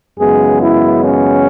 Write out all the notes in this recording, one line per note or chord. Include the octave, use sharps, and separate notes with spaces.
F#2 C#3 E3 G#3 B3 G#4
E4
C#4